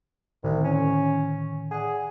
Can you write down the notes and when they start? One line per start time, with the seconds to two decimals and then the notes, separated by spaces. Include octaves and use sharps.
0.44 C2 A2 D3 D#3
0.64 C#4
1.71 G#4 D5 F#5